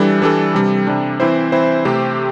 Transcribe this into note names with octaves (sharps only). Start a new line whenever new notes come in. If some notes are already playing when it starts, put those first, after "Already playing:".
Already playing: E3 G3 D4 A4
E3 G3 D4 A4
C3 G3 D4
C3 G3 D4
E3 C4 E4 C5
E3 C4 E4 C5
C3 A3 C4 G4 C5